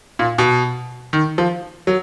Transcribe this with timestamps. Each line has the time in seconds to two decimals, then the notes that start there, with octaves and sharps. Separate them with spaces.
0.19 A#2
0.38 B2
1.13 D#3
1.38 F3
1.87 F#3